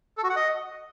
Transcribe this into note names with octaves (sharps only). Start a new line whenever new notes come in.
A4
F#4
F#5
D#5